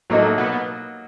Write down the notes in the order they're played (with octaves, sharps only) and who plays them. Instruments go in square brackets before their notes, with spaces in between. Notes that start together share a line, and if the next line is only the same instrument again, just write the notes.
[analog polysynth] A2 A3 [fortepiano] F#3 A#3 D#4 F#4
[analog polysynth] B2 B3